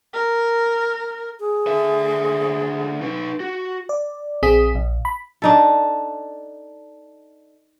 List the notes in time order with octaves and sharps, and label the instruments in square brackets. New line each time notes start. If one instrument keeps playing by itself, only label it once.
[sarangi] A#4
[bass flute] G#4
[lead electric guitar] D3 E5
D#4 B4
F#4
[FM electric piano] D5
A#1 C4 G#4 D#6 B6
A#1
B5
[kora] D4 D#4 A4